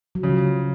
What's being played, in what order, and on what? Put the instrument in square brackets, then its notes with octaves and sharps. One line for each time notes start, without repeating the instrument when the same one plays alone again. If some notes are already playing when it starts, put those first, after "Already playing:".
[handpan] F#3
[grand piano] C#3 [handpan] F3